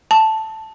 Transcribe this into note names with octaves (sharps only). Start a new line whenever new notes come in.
A5